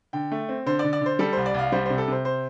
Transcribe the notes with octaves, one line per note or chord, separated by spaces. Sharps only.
D3 G5
A3
C4
D3 C5
D5
D3
D5
D3 C5
G3 A4
C2 C5
D5
C2 F5
G3 C5
C3 C5
A4
C3 C5
C5